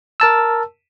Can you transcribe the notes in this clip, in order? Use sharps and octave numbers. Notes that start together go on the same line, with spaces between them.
A#4 A5 E6